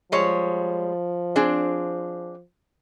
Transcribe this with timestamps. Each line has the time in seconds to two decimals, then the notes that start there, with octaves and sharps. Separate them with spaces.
0.12 F3 G3 G#3 C#5
1.36 C4 D4 G#4